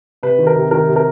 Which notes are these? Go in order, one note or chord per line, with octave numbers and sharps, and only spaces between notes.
C3 B4
D#3
A#4
C3
D#3 A#4
C3
A#4